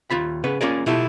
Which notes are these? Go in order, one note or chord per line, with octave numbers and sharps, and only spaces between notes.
D#2 F4 B5
C#3 B4 F#5
A#3 C#4 F4 G#4 A#4 D5
B2 E4 F4 G4 A4